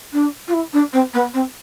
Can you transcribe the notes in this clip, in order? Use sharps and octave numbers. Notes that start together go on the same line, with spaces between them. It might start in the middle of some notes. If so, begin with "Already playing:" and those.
D4
F4
E4
D4
C4
B3
C4